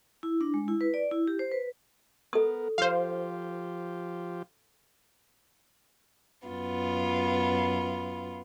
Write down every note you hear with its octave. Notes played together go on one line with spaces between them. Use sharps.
E4
D4
G#3
E4
B4
D5
E4
G4
C5
B4
B3 A4 A#4 D#6
F3 F4 G4 C5 F5
F#2 B3 F4